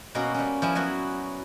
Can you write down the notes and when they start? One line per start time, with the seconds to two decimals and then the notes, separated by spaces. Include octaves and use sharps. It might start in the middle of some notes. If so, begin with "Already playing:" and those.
0.15 B2 A#3 C#4 F#4
0.34 G3 C#4
0.62 F3 E4 G#5
0.75 F#3 B3 E4 F#4